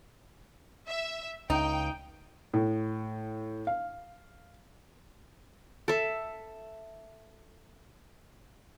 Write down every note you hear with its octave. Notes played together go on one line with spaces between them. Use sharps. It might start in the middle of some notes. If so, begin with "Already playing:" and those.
E5
C#2 D#4 G5
A2
F5
A4 E5